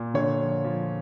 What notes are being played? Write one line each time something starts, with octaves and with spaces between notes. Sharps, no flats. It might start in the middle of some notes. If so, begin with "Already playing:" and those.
Already playing: A#2
D3 C#5
F3
F3